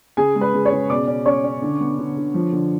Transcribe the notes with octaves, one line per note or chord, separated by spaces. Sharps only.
C#3 G#4 G#5
G#3
B4 B5
C#3
C#5 C#6
C#3
B2 D5 D6
C#4
C#4 C#5 C#6
C#4
D3
B3
D3
D3
F3
D3